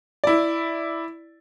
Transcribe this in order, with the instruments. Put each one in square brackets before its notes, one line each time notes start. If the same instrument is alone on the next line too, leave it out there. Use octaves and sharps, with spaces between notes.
[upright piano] E4 D5